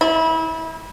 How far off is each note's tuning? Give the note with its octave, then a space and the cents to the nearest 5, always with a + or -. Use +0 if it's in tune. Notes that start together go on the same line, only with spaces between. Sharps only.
E4 -30